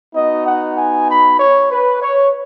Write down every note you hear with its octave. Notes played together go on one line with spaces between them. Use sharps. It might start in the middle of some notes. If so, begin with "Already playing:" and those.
B3 D#4 F#4 D#5
F#5
G#5
B5
C#5
B4
C#5